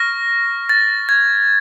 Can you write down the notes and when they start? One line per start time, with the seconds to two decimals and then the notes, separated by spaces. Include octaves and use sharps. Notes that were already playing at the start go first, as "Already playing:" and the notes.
Already playing: C#6 F6 A#6
0.69 A6
1.09 G#6